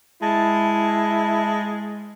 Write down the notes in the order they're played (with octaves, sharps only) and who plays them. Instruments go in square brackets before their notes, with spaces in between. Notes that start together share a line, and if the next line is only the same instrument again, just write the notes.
[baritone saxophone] G#3 [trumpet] E4 [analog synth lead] A5